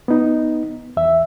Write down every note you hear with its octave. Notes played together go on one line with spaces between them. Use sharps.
B3 D#4
E2 E5